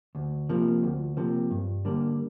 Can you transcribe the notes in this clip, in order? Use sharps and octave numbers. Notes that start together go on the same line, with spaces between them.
D2
C3 F3 A#3
D2
C3 F3 A#3
G2
D3 G3 A#3